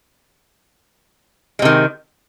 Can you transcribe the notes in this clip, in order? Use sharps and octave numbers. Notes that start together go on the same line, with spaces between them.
C3 D#3 G#3